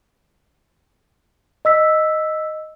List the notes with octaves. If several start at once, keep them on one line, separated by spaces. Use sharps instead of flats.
D#5 E6 B6